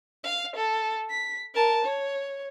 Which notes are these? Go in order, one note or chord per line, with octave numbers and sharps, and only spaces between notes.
F5
A4
B6
A#4 A5
C#5